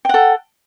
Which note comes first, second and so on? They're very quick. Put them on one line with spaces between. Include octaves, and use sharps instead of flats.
G5 F#5 A4